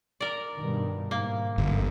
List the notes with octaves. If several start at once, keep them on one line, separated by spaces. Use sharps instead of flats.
A#4 D5
G2 B2 D#3
G#2 A#3
G1 C2 F#2